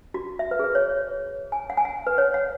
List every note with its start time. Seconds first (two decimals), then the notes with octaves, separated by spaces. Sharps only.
0.14 F#4
0.39 E5
0.51 B4
0.59 G#4
0.64 B4
0.75 C#5
1.52 G#5
1.70 F#5
1.77 G#5
1.85 F#5
2.07 B4
2.18 C#5
2.34 F#5